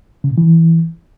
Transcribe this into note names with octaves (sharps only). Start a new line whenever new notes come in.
C#3
A#2
E3